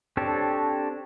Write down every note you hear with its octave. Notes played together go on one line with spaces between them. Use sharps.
C4 D4 G4 A4 C#5